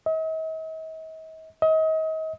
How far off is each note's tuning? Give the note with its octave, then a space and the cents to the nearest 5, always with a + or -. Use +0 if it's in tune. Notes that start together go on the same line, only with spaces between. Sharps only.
D#5 +45
D#5 +35